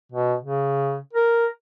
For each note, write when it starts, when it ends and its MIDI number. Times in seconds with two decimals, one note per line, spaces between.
0.12 0.34 47
0.42 0.98 49
1.13 1.46 70